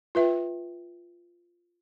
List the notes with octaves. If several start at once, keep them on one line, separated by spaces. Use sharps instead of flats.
F4 B4 E5 G5